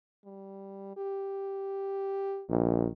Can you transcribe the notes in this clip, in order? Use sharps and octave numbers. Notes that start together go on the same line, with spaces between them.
G3
G4
A#1 D#3